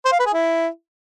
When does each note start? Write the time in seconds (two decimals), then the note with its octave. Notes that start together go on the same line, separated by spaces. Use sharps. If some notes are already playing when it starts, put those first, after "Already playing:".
0.05 C5
0.12 F5
0.19 B4
0.26 G#4
0.33 E4